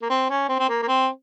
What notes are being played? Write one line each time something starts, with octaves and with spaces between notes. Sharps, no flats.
A#3
C4
C#4
C4
C4
A#3
A#3
C4